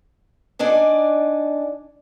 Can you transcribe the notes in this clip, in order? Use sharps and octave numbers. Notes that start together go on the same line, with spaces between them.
D4 D#4 D5 G#5